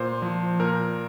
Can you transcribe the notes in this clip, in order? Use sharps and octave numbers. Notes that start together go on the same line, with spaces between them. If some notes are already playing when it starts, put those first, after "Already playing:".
Already playing: A#2 C5
F3
A#2 A#4